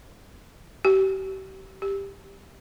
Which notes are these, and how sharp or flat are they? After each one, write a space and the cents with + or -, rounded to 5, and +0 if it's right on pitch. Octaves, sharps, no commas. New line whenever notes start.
G4 -40
G4 +10